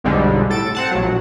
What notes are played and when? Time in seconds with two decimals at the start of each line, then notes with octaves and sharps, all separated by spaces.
0.04 B1 F2 G#2 D3 G3 G#3
0.50 A2 A4 A6 D7
0.75 C4 F#5 A5
0.91 A#1 F#3